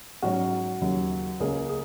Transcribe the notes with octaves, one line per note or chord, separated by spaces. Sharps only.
G#2 F#3 C#4 F#4
D#2 C#3 F#3
C#2 C#3 A#3 C#4 G#4
G#4